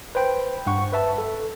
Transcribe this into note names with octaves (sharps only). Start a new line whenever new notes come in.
B4 C5 G5 B5
G2 F#5 C#6
B4 E5 A5
A4